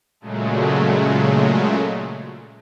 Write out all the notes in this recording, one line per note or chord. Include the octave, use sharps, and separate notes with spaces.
A#2 C#3 F#3 G#3 A3